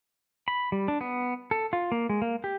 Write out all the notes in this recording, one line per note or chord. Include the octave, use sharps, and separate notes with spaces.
B5
G3
D4
B3
A4
F4
A#3
G#3
A#3
G4